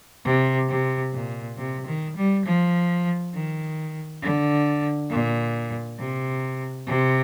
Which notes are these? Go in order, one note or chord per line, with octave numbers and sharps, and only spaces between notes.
C3
C3
A#2
C3
D#3
G3
F3
D#3
D3
A#2
C3
C3